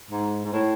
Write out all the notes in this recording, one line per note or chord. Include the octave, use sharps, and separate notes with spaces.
G#2
G#2
A2